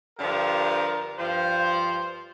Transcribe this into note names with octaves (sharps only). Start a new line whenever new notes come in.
G2 D3 F3 A#4
G2 F3 C5